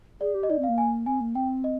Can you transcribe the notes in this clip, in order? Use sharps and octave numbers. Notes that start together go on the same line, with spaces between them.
G#4 D5
G4
D#5
D#4 D5
C4 F5
A#3
G#5
C4 G#5
A#3
C4 G5
D#5